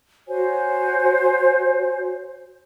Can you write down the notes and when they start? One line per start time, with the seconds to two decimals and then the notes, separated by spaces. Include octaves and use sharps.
0.28 F#4 C5 C#5 G#5